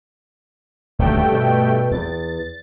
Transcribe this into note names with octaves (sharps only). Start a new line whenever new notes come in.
D#1 D2 G2 A3 G5
B2
E2 A6